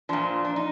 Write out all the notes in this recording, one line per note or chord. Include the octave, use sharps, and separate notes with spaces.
A#2 F3 D4
D4
D#4